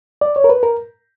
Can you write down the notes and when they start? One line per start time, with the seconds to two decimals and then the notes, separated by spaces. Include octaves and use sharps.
0.21 D5
0.36 C#5
0.44 A#4
0.50 B4
0.63 A#4